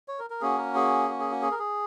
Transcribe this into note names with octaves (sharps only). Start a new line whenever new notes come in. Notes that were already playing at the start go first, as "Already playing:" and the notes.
C#5
A#4
A#4
A#3 C#4 F#4 G#4
A#4
G#4
F#4
G#4
F#4
G#4
A#4
G#4